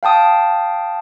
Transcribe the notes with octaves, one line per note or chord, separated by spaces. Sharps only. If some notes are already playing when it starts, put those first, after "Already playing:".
F5 G5 A5 D#6